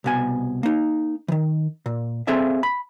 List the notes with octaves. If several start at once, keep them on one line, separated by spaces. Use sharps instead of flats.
C2 B2 G#5
A#3 D#4
D#3 E3
A#2
C4 G#4 A4 E5 F5
B5